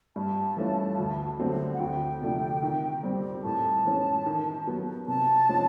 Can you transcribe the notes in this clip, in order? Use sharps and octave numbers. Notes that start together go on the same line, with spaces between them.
G2 A5
E3 A3 C#4 F4
D2
D3 F#3 A3 C4
F#5
D2 G5
C3 F3 A3 D4
D#3
G3 C4
A2 A5
E3 G#3 C#4
D#3
F#3 B3
C3 A5
F3 G#3 C#4